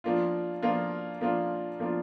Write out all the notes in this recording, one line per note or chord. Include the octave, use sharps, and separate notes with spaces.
F3 A#3 D4 F4
F3 A#3 D4 F4
F3 A#3 D4 F4
F3 A#3 D4 F4